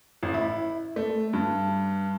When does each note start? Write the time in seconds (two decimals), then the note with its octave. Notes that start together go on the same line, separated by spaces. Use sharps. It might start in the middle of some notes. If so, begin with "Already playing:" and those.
0.23 A1
0.34 E4
0.96 A3
1.33 G2